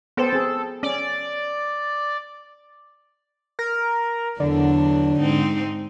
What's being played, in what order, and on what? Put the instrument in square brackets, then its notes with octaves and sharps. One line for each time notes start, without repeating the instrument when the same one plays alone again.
[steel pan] B3 C5 G5 [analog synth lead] A4
[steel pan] C4 G#4
[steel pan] C#4 [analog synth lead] D5
[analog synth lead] A#4
[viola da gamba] E2 F#3 D4 [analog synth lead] D3
[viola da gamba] G#2 C4 D#4